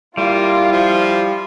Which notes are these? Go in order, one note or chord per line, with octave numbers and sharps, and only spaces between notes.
G3 A#3 E4 F4
F3